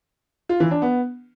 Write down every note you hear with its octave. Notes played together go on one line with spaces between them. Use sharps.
F4
E3
D4
B3